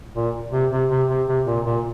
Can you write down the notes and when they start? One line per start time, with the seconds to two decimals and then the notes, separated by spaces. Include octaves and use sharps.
0.16 A#2
0.52 C3
0.72 C3
0.90 C3
1.09 C3
1.27 C3
1.46 A#2
1.65 A#2